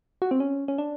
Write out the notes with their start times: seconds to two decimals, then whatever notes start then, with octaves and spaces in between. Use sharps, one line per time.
0.22 F#4
0.31 C4
0.40 C#4
0.68 C#4
0.78 D4